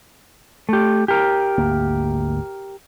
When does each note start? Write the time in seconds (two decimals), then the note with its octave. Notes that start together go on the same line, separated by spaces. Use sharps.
0.69 A3 G4
1.08 G4 A#4
1.58 G#1 D2 A#3